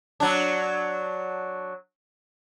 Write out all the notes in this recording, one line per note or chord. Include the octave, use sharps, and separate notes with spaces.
F#3 D4